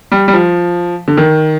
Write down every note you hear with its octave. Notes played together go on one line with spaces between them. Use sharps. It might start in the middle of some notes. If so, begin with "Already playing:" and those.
G3
G3
F3
D3
D#3